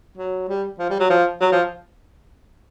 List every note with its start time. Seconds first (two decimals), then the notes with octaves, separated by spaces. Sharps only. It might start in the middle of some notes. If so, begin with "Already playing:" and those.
0.17 F#3
0.49 G3
0.79 F3
0.90 G3
1.00 F#3
1.10 F3
1.41 F#3
1.52 F3